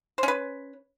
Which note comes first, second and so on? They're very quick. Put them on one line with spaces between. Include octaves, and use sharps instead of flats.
C5 C#4 B4